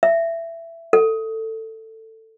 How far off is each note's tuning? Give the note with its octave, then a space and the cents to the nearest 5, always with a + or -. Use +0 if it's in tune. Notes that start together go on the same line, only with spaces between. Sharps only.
E5 +15
A4 +15